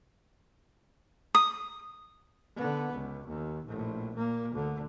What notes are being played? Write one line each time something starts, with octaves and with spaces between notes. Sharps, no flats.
D#6
D3 B3
C#2
D#2
A#1 A2
A#2 A#3
D2 D3